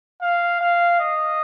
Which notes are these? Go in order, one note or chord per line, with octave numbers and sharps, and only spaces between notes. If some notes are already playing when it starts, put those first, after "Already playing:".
F5
F5
D#5